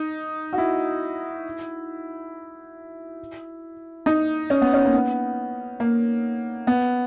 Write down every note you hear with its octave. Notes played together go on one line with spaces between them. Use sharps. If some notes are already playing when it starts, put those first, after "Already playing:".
Already playing: D#4
F#4
E4
D#4
C#4
B3
C#4
A#3
B3
A#3
B3